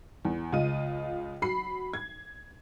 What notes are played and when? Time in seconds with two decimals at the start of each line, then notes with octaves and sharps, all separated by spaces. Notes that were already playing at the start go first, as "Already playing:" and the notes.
0.25 E2
0.52 C#2 F4 D#5 D#7
1.42 F#3 B5 C7
1.94 G#6